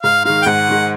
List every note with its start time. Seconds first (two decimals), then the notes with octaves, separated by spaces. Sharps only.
0.03 G#2 F5
0.24 D#3 G#3 F5
0.42 G5
0.46 G#2 F#5
0.69 D#3 G#3